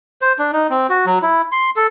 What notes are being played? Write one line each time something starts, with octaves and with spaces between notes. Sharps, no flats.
C5
D4
D#4
C4
F#4
F#3
E4
C6
A4